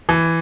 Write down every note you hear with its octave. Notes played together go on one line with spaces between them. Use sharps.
E3